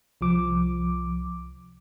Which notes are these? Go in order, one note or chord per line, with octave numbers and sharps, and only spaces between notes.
C2 F3 D6